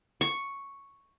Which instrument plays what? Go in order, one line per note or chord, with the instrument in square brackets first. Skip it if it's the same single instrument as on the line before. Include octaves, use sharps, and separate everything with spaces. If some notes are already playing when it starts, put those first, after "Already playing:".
[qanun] C#6